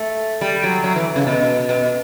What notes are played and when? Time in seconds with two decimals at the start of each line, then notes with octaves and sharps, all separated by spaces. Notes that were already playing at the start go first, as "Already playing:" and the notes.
Already playing: A3
0.41 G3
0.64 F#3
0.84 F#3
0.96 E3
1.16 C#3
1.27 B2
1.69 B2